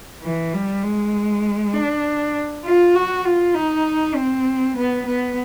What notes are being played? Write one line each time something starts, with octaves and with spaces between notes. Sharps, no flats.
E3
G3
G#3
D4
F4
F#4
F4
D#4
C4
B3
B3